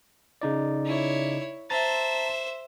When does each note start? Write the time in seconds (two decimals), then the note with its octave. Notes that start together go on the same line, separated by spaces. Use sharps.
0.42 C#3 D#4 D5
0.86 E4 C#5
1.70 C5 E5 A5 A#5 A6